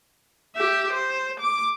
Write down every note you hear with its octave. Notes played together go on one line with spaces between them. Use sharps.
G4 E5
C5
D6